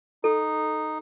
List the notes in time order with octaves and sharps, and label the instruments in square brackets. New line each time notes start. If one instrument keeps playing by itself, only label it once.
[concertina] D#4 [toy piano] A4